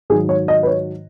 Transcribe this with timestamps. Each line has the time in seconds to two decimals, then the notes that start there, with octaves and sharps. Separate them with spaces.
0.10 G#2 D#3 F#3 G#4
0.29 C#5
0.48 D#5
0.63 B4
0.67 C#5